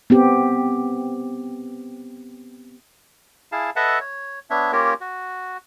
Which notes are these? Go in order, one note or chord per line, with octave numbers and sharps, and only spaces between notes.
B3 C4 G4
E4 G#4 F5 A5
A4 B4 D#5 E5 F#5 A5
C#5
B3 D4 C#5 E5
A#3 C#4 F4 G4 A#4 C#5
F#4